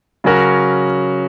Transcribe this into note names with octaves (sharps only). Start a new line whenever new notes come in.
C#3 F#3 C#4 F#4 A#4